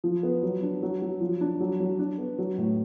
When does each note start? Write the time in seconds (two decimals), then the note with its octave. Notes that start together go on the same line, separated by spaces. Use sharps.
0.04 F3
0.23 B3
0.43 F#3
0.63 D4
0.82 F#3
1.02 F#3
1.21 F3
1.41 D4
1.60 F#3
1.80 F#3
1.99 D4
2.18 B3
2.38 F#3
2.58 A2